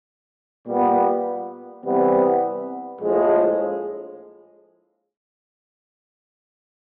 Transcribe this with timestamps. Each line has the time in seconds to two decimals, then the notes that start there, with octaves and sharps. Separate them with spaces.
0.67 A#2 G3 B3
1.84 C3 E3 G3 B3
3.01 A#1 A2 F3 G#3